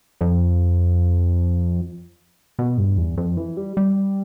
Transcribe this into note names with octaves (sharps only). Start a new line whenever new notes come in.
F2
B2
G2
E2
F2
E3
G3
G3